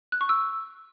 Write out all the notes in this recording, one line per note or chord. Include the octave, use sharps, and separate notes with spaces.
F#6
C#6
E6